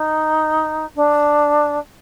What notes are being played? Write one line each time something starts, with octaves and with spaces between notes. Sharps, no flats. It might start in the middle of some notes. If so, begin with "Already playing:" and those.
Already playing: D#4
D4